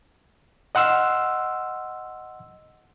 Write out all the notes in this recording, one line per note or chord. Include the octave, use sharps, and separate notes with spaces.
D#5 F#5 C6 E6 F6